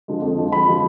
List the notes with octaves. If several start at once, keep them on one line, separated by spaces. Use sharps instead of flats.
D3 F3 G#3
F2
D3 F3 G#3
F2 B5
D3 F3 G#3